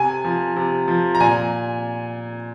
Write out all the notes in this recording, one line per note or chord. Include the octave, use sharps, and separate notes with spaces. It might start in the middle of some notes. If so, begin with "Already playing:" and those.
Already playing: C3 G#5
F3
C3
F3
A#5
A#2 G#5